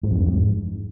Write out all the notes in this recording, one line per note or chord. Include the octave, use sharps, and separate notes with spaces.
G#2
F2
G2
F2
G#2